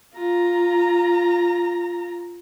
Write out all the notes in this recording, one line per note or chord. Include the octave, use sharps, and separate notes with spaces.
F4 A#5